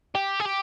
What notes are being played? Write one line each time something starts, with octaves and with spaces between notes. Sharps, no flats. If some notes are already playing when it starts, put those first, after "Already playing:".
G4
G#4
G4